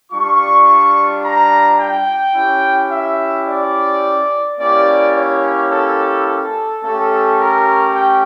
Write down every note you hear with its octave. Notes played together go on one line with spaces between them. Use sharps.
G3 D4 F4 C#6
A#5
G5
C#4 E4 G4
E5
D5
A#3 C#4 E4 G4 D5
C#5
A4
A4
A3 C#4 G4 A4
A#4
G5